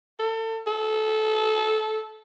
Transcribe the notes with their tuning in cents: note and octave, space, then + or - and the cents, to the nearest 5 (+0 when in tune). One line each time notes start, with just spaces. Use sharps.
A4 +30
A4 -20